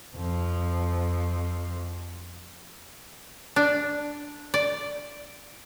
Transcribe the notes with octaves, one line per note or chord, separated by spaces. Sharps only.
F2 F3
D4
D5